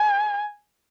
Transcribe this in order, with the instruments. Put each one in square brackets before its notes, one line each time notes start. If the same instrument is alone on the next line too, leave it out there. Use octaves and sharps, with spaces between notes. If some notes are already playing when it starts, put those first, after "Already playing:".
Already playing: [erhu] G#5